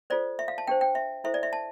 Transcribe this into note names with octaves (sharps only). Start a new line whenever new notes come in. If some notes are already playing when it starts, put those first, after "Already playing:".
F4 A4 C5 D5
E5
F5
A5
D4 G4 C5 G5
G5
E5
E4 A4 C5 E5
D5
E5
A5